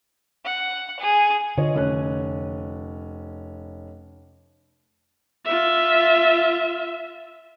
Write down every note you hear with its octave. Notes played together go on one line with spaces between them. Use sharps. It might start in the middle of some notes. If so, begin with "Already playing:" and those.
F#5
G#4
D3 F4 C#5 D#5
F1 C#4 F#6
F4 E5